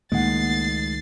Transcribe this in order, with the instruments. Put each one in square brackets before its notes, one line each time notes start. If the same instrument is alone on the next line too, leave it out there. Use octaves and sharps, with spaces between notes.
[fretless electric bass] C#2 A2 D#3 [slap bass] G#3 [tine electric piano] A#3 F#5 [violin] A6 C7